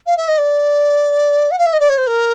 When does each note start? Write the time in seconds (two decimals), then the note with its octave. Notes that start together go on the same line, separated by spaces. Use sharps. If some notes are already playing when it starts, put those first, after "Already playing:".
0.06 F5
0.17 E5
0.28 D#5
0.38 D5
1.51 F#5
1.59 F5
1.66 E5
1.73 D#5
1.80 D5
1.89 C#5
1.98 C5
2.07 A#4